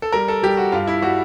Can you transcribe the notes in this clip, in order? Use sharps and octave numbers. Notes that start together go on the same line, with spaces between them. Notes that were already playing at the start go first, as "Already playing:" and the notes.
A4
G3 A#4
A4
G3 G4
F#4
G2 F4
E4
G3 F#4